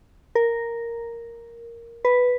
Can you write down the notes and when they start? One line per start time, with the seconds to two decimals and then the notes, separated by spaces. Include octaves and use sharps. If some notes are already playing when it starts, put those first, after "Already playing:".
0.35 A#4
2.05 B4